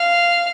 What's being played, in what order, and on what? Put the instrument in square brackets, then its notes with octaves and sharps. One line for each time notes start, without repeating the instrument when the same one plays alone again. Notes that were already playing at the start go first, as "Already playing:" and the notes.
Already playing: [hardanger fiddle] F5